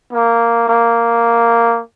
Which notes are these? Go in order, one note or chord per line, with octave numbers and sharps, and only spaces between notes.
A#3
A#3